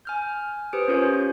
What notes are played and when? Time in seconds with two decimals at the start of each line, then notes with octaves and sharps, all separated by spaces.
0.05 G#5 F6 G6
0.73 G4 B4 C5 D#6 C#7 D7
0.88 C#4 F4 A#4 C5 C#5